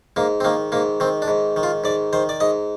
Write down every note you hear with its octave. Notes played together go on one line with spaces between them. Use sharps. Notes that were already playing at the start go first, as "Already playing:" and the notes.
G#2 A#3
C4
D#3 A#3
G#2 A#3
D#3 C4
D4
G#2
D#3
F4
G#2 D5
D#3 C5
D5
G#2 D#5